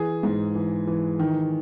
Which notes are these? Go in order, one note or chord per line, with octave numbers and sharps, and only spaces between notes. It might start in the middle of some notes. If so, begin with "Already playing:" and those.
Already playing: E3 G#4
G#2
E3
E3
D#3